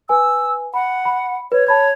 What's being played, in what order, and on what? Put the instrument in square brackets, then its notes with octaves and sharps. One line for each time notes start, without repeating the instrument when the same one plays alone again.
[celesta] B4 G#5 [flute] E6
[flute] F#5 [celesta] B5
[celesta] B5
[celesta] B4 [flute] C#5
[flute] C#5 [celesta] A5 B5 G#6